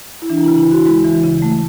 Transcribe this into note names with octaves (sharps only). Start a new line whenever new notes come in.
E4
E3 D4
C#3 E4
E4
D2 F#4
G#3 E4
E3
C#3
A3